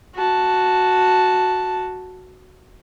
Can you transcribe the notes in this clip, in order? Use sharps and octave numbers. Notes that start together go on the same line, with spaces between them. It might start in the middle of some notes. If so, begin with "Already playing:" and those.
F#4 A5